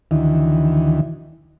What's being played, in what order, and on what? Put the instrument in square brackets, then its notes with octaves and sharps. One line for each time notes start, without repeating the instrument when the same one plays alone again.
[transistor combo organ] D2 D#3 E3